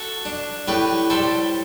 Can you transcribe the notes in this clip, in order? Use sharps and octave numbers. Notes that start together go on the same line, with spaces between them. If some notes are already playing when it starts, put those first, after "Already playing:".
Already playing: F#4 A4
D4
A2 G4 B4
G3 A4 C5